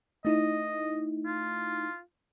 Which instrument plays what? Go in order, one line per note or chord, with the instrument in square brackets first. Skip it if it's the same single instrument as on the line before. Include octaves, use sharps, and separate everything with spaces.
[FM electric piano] A3 D#4 E4 [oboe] D#5
[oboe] F4